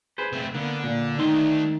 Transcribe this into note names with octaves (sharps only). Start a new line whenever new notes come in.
G#4 B4 C5
A3 C4
D3 A#3 B3
A#2
D#3 A3 D4 D#4 C6